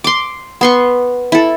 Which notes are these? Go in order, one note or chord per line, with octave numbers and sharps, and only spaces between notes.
C6 D6
B3 C6 C#6
E4 A4